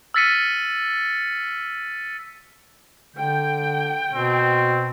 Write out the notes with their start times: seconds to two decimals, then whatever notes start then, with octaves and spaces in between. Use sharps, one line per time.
0.14 E6 F6 A6 B6 C#7 D#7
3.16 D3 G5
4.14 B2 C4